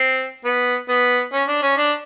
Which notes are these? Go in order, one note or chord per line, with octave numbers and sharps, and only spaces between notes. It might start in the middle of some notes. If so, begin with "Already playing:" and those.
Already playing: C4
B3
B3
C#4
D4
C#4
D4